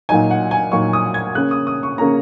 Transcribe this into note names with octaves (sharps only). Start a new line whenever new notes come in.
A#2 F#3 D#4 G#5
F#5
G#5
A#2 F#3 D#4 C#6
D#6
G#6
C#3 A#3 C#4 F#6
D#6
D#6
C#6
C#3 A#3 C#4 A#5